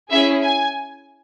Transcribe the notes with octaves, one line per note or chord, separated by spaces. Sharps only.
C#4 E4 G#4 E5
G#5